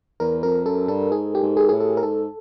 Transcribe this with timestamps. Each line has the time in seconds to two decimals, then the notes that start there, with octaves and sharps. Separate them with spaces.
0.20 E2 A#4
0.43 F2 A#4
0.66 F#2 A4
0.88 G2 A4
1.11 G#2 G#4
1.35 G4
1.42 G#2
1.57 G#4
1.69 A2 G#4
1.80 A4
1.97 A#4
2.03 G#2 A4